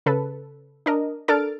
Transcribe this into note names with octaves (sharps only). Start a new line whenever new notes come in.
C#3 A4 B4
D4 A#4 D#5
D4 A4 A#4 F6 A6 D7